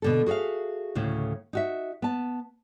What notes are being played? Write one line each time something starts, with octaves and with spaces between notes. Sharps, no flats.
B2 D3 A4
F#4 G#4 D5 E5 F5
D2 A2 C#3
D#4 F#4 E5
B3 A5